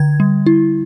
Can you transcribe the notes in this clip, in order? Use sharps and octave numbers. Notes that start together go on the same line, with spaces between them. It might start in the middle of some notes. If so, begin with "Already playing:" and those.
Already playing: D3 G#6
G3
E4